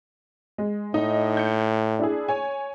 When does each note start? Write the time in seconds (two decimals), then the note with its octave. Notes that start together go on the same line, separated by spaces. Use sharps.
0.58 G#3
0.94 A2 D#4
1.37 G6 C#7
1.99 D4 E4 G#4
2.28 C#5 G#5